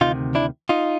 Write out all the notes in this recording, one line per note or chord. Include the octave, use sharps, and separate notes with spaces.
D2 C3 D#3 D#4 F4
D4 E4
D#4 F4